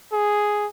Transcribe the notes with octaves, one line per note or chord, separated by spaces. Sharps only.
G#4